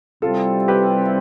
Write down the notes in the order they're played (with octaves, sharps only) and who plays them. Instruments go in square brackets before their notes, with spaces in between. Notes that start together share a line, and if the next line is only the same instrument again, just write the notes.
[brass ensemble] C3 G3 C4 E4 [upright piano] F4 A4
[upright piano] G4 B4